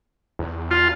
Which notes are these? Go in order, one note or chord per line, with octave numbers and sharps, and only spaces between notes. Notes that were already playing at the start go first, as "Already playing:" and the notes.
E2
F4